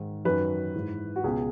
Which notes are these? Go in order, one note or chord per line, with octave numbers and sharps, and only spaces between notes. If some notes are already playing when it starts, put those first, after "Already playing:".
Already playing: G#2 D#3
F#2 D#3 B4
G#2 E3
F#4
C#2 B2 G#4